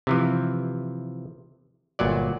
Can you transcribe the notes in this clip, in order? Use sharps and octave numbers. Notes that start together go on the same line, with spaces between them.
C3 E3 F3
G1 A#2 F#3 D5